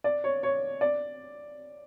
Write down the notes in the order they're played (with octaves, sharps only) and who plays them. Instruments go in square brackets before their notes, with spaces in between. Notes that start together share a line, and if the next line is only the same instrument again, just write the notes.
[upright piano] D5
C#5
C#5
D5